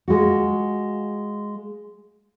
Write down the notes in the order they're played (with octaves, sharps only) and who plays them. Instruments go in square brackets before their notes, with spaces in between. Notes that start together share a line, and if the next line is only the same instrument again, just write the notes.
[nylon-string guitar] G#3 F4 F#4